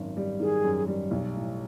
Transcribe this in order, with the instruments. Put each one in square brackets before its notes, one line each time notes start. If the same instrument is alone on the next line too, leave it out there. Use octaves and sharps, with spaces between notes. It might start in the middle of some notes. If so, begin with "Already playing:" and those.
Already playing: [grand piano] G#1 F#2
G3
[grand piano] D#3 [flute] G#4
[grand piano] F#2
G3
B1
A2